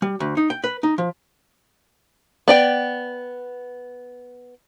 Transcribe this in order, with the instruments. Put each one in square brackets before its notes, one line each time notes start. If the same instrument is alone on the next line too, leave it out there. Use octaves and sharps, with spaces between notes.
[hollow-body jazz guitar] G3
D2
D#4
G5
B4
D#4
F3
[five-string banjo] B3 D5 G5